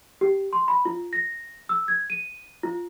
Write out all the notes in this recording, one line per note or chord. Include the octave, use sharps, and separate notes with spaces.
G4
C6
B5
F4
A#6
E6
G#6
D#7
F4